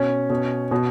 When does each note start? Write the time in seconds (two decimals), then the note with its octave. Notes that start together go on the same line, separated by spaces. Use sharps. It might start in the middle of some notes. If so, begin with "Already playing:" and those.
Already playing: B2 C#4
0.30 B2
0.71 B2